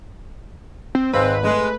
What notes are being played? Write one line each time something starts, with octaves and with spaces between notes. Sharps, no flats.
C4
G#1 G#3 C4 B4 F5
G#3 A3